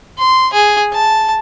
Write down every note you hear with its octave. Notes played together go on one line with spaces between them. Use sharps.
C6
G#4
A5